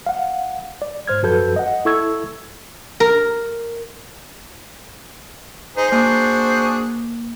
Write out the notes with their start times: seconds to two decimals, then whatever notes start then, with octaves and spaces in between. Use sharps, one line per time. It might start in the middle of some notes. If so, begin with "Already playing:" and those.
0.06 F5 F#5
0.82 D5
1.07 G#2 C5 F6 G#6
1.23 F#2 F3 F#4 A4 B4 G6
1.56 D#5 F#5
1.85 E4 A4 C#6 E6 G#6
3.00 A#4
5.77 D#4 G#4 C5
5.91 A#3 D4 F#4 G#4